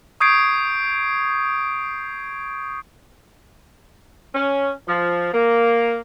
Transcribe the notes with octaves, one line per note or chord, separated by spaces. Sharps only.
C#6 D#6 G6 G#6 C7 D7
C#4
F3
A#3